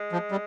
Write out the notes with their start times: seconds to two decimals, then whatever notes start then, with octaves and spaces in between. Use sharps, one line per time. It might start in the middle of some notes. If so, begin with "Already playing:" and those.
Already playing: G#3
0.12 F3
0.31 G3